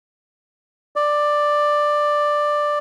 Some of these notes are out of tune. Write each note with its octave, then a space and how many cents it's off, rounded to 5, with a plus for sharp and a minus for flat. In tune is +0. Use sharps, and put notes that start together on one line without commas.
D5 +10